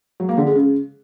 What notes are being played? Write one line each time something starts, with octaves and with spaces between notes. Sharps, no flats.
F#3
A#3
D3
G#3
C#3